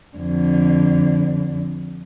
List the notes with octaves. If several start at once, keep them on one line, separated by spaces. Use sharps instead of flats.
F2 D3